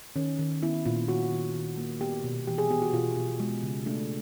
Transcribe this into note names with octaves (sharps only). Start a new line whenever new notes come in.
D#3 C#4
D#3
B3 E4
A#2 F4
D#3 F#4
D#3
D#3
A#3
B3 G4
B2
E3 G4
G#4
B3 G4
F#4
B2 F4
B2
G#3
C#3
A3 D4